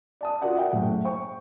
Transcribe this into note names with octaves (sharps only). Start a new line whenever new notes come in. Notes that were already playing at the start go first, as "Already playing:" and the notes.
D5 A5 D#6
F4 F#4 A#4 D5 F#5
E5 F#5 G5
F#1 A2
C5 G5 C#6